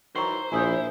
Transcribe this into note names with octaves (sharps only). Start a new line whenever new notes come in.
D#3 E3 F#3 C5 A#5 C#6
A#1 E4 G#5 D#6 G6